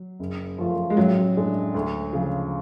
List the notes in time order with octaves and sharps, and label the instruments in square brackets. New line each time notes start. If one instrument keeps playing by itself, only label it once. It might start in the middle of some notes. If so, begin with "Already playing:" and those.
Already playing: [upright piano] F#3
[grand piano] F#1
F#2 F3 A3 F4
[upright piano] G#3
[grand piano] A1 [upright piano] F#3
[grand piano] A2 G#3 D4
D2
C#3 F3